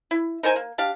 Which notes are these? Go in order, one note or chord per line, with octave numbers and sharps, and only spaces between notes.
E4
D#4 A#4 C5 G#5
A#3
D4 G4 F5